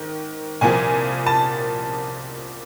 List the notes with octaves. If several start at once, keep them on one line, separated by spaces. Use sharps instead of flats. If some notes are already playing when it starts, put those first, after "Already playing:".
Already playing: G#2 D#3
C2 A#2 F3 A#3 G#5
A5